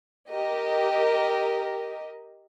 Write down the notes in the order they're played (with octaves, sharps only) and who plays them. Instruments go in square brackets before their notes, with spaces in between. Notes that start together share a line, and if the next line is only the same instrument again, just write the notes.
[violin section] G4 A#4 D#5